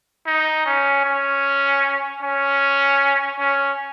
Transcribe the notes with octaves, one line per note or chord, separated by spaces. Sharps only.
D#4
C#4
C#4
C#4
C#4